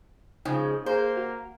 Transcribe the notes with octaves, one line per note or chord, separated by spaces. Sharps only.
C#3 F3 G#3 D#4
A#3 G#4 C5
F#4